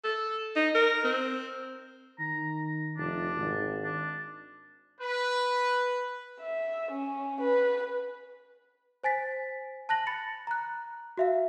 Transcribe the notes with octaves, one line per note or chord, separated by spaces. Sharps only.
A4
D#4
A#4
C4
D#3 A#5
F1 D4
G#1
D4
B4
E5
C#4
B4
C5 G#5 A6 B6
A5 F#6 A#6 F#7
B5 A6 C#7
A#5 F#6
F#4 E5 F5